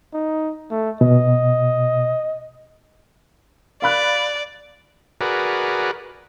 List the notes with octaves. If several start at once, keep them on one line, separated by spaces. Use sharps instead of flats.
D#4
A3
B2 D#5
D5 F5 B5 F#6
F#4 G#4 A#4 B4 D5